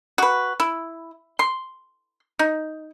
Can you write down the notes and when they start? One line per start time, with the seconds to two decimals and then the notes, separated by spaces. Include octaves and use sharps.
0.18 F#4 B4
0.60 E4
1.39 C6
2.39 D#4